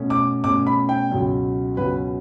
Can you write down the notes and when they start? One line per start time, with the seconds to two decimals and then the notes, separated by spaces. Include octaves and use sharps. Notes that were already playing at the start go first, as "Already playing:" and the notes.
Already playing: B2 A3 C#4
0.10 D6
0.44 B2 A3 C#4 D6
0.67 B5
0.89 G5
1.10 C#2 B2 F#3 C#4
1.77 C#2 B2 F#3 C#4 B4